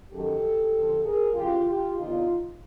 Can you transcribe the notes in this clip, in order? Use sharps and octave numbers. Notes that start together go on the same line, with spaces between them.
F#2 D#3 F#3 G4 A4
F2 D3 F3
G#4 A#4
F#2 C#3 E3 F4 G4
F4 G4
E2 C3 D#3 D#4 F4